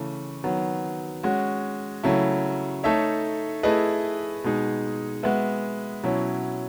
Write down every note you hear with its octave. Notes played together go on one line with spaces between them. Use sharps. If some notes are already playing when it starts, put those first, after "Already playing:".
Already playing: C#3 E3 A3
D#3 F#3 B3
G#3 C#4 F#4
C#3 F#3 A3 E4
A3 D#4 A4 C#5 E5
A3 E4 G#4 B4 D#5
B2 G#3 D#4 G#4
G#3 B3 F#4 B4 E5
B2 F#3 C#4 E4